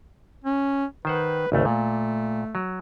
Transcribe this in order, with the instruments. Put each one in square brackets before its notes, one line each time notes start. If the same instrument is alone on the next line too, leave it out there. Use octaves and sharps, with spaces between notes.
[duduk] C#4
[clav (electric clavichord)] D#3 C5 F#5 [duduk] B4
[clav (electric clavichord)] G#1 D2 A3 [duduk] C#3
[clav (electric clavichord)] A#2 [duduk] A3
[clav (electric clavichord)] F#3